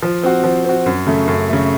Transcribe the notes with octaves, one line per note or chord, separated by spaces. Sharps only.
F3
C4 F#4
F3
C4 F#4
F#2
C#3 A3
F#2
C#3 A3